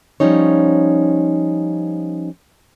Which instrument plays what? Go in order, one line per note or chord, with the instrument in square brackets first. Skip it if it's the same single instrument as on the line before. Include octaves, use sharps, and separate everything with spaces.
[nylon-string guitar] F3 G3 C#4 D#4 C#5